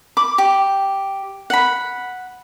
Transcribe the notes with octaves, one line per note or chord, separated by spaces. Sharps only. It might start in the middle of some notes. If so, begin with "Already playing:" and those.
B5 D6
G4
F#5 B5